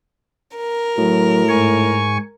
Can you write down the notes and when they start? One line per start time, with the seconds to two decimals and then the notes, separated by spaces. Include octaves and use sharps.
0.56 A#4
0.98 A2 F#3
1.49 G#2 G#5 C#6